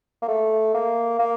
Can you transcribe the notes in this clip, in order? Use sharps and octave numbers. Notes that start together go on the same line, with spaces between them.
A#3
A3
A#3
A#3